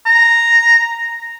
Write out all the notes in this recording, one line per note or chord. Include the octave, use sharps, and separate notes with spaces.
A#5